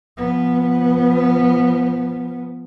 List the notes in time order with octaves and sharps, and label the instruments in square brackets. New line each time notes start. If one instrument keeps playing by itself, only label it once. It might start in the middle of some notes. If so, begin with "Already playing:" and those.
[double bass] F3 B3